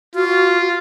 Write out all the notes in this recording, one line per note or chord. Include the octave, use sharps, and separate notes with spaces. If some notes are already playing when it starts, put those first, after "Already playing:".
F4 F#4